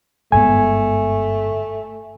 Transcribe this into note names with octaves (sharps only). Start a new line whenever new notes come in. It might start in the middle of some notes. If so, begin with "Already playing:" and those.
G1 G#2 A3 B3 G#5